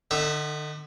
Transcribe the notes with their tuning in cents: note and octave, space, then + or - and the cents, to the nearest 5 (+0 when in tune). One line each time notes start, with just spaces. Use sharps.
D3 +35 D#4 -20 E5 +0